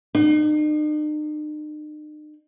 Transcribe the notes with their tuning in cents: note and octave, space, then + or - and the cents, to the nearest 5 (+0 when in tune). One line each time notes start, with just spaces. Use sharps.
D#4 -45